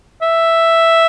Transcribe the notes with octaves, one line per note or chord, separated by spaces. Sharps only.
E5